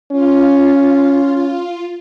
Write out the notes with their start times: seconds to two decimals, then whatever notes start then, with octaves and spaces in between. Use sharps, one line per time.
0.11 C#4 F4